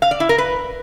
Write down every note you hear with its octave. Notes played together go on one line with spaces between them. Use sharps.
F5
D5
E4
A#4
B4